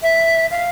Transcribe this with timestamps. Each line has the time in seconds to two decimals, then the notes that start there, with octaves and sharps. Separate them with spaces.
0.03 E5
0.51 F5